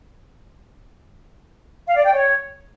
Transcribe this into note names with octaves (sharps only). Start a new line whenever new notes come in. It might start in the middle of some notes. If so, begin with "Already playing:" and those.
F5
D5
G5
C#5